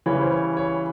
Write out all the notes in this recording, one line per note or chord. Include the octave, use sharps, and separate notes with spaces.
C#3 E3 G3 C#5
C5
C#5
C#5